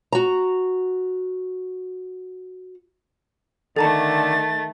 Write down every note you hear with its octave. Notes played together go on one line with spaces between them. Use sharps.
F#4 A#5
D3 D#3 A3 A4 A5 A#5 A6